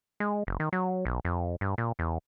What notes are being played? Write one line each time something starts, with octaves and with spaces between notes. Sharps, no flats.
G#3
F#1
D#3
F#3
B1
F2
G2
A#2
E2